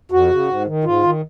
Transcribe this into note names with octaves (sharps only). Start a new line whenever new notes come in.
F2 F#4
C#3
G#2
D#3
G#2 F4
D#3